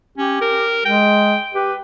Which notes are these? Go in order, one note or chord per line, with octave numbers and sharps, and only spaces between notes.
C#4 G4
A#4
G#3 G5
G4 B4